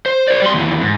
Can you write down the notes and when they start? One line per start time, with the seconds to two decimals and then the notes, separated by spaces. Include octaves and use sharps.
0.06 C5
0.28 C5 D5
0.42 G3 C6
0.54 D#2 E3
0.82 G#2